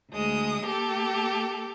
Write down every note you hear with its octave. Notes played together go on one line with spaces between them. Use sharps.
D2 G#3 D#6
A#3 G4 A4